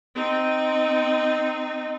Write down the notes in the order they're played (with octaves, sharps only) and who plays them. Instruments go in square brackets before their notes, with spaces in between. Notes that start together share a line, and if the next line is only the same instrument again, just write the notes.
[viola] C4 D#4